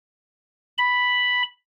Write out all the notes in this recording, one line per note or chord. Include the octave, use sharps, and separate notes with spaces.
B5